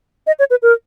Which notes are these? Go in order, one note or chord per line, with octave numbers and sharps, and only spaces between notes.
D#5
C#5
B4
A#4